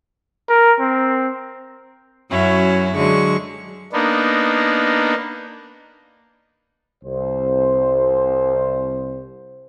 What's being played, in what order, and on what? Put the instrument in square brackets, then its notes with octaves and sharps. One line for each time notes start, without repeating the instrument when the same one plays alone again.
[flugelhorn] A#4
C4
[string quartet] F#2 F#3 C#4 E4 F#4
D3 F#3 G#3 C#6
[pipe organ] A#3 B3 D4 D#4
[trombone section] C2 C5